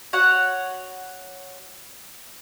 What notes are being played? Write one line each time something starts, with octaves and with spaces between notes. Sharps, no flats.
F#4 C#5 F#5